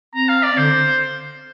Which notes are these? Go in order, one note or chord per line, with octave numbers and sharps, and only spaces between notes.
C4 A#5
F5
D5
D3 C5